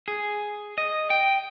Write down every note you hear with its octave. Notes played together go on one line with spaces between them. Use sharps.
G#4
D#5
G5